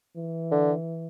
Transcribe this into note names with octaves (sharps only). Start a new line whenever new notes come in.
E3
D3